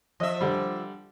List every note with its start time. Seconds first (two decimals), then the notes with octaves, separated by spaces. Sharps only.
0.20 F3 D#5 E5
0.41 D3 G3